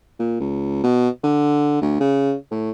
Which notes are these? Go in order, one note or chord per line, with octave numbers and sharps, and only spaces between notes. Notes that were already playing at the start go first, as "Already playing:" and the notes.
A#2
C#2
B2
D3
D2
C#3
A2